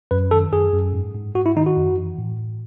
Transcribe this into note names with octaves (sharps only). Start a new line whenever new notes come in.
F#2 B4
D#3 A4
F#2 G#4
F#2
G#2
G#2
G#2 F#4
E4
D#3 D#4
F#4
F#2
E3
A2
A2